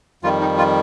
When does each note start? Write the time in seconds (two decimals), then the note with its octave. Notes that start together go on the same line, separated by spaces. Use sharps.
0.23 F2 D#3 G3 F4
0.41 D#4
0.58 F4